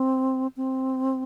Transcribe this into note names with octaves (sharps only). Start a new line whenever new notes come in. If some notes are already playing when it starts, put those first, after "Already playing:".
Already playing: C4
C4